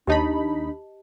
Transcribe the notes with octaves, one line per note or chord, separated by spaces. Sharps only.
D#2 D4 D#4 G4 D#5 A5 B5